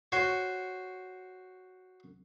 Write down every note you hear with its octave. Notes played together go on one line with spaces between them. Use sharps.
F#4 C5 C#5